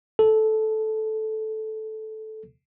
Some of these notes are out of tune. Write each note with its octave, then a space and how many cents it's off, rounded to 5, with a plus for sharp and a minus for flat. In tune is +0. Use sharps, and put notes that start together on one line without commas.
A4 -10